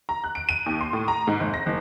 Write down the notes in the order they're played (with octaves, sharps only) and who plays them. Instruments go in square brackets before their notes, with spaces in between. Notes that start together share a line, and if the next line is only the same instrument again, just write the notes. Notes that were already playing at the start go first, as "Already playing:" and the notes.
[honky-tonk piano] A#5
F#6
D7
D#7
D#2
C6
A2
A#5
G#2
F1
A#6
F#1